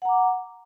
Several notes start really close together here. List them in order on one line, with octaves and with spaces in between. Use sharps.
F#5 A#5 D6